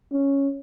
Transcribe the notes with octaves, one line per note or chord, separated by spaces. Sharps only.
C#4